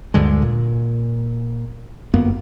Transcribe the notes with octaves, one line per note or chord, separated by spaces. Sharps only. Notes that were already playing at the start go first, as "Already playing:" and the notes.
D2 G2 D3 G#3
A#2
G1 F#2 A#3 B3